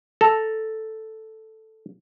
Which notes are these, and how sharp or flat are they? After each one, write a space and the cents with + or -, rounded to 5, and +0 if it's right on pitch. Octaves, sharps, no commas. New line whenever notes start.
A4 +0 A#5 +0